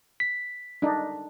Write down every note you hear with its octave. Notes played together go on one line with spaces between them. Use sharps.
B6
D4 D#4